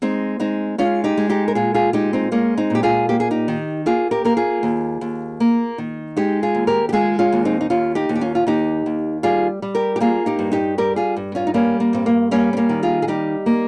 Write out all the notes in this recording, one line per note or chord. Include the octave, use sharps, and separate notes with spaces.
G#3 C4 D#4
G#3 C4 D#4
G#3 C#4 F4
D#4 G4
G#3
D#4 G4
A#4
A#2 F4 G#4
F4 G#4
G#3 D#4 G4
C4 D#4
G#3 A#3 C#4
C4 D#4
A#2 G4
F4 G#4
A#3 G4
G#4
D#4 G4
D#3
A#3 F4 G#4
G4 A#4
A#3 A#4
F4 G#4
D#2
D#2
A#3
D#3
G#3 D#4 G4
F4 G#4
D#2
G4 A#4
G4
G#3 F4 G#4
C#4 F4
D#2
C4 D#4
D#4
D#2 C#4 F4
D#4 G4
D#2
G4
C#4 F4
F4
D#2 D#4 G4
D#2
G3 F4 G#4
G3
G4 A#4
G4
A#3 F4 G#4
D#4 G4
G2
D#4 G4
G3 G4 A#4
F4 G#4
G2
C#4 F4
D#4
G3 A#3 C#4
A#3
G2 C4
A#3
G3 A#3 C#4
C4
A#3 C#4
D#3
F4 G#4
G#4
G3 D#4 G4
A#3